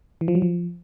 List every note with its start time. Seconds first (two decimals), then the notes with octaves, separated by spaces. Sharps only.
0.21 E3
0.28 F3
0.35 F#3
0.42 F3